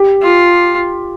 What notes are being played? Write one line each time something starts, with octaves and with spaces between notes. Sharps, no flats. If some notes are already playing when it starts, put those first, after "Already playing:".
Already playing: G4
F4